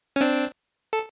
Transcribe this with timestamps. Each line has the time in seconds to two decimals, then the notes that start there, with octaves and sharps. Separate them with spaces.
0.16 C#4
0.21 C4 D4
0.93 A4